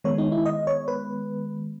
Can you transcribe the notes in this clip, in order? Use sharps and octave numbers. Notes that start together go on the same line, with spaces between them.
D#3 G#3 B3 C#5
D#4
E4
D#5
C#5
B4